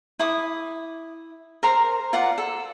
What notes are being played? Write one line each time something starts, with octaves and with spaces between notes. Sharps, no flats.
E4 D6 D#6
A#4 C5 A#5
F4 A#4 D5 F#5
A4